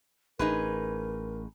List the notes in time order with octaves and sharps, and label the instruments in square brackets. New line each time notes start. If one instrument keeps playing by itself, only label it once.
[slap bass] A1 [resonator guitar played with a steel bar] D#4 G#4 B4 [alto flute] A#4